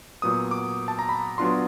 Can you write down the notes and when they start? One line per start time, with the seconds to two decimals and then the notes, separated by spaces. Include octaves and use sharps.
0.22 A#2 F#3 B3 D#6
0.51 D6
0.88 A5
0.99 A#5
1.09 B5
1.38 F#3 B3 D4 F4 C6